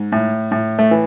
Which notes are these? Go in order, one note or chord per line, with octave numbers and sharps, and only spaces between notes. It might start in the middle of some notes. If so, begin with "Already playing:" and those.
Already playing: G#2
A2
A2
A3
E3